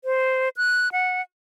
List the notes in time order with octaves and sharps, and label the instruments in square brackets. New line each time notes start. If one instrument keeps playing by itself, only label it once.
[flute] C5
F#6
F#5